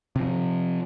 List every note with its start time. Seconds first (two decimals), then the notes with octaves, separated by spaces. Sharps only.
0.16 C3 F3